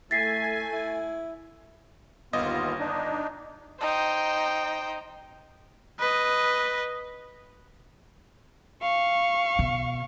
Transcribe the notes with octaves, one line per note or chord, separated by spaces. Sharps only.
A3 E4 G#5 A6 B6 C7
E4
G1 D#2 B3 F4 D#5
D4 D#4
D#4 C5 G5
B4 D#5
F5 C#6
B2